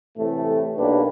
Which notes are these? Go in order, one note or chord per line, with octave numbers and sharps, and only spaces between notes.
A2 C3 E3 A3
B1 A#3 D4 G4 B4